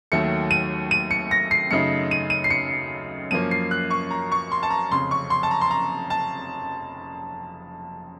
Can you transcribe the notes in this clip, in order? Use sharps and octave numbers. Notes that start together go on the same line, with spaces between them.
D#2 D#3 F#3 A3 C#7
D#7
D#7
C#7
A#6
C7
F#2 C#3 A3 D#4 C#7
D#7
D#7
C7
C#7
F#2 F3 A#3 C#4 D#7
C7
F#6
C#6
A#5
C#6
C6
A5
A#5
F1 F2 C#3 C6
C#6
C6
A5
A#5
C6
A#5
A5